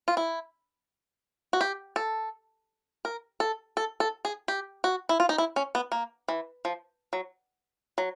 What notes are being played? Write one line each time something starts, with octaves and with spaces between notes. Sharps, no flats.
F4
E4
F#4
G4
A4
A#4
A4
A4
A4
G#4
G4
F#4
E4
F4
D#4
E4
C#4
B3
A#3
E3
F3
F#3
F#3